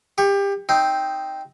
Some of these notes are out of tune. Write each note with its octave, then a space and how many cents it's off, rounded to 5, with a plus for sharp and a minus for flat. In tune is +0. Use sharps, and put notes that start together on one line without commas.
G4 +25 C#6 -5
C4 +0 D#4 +0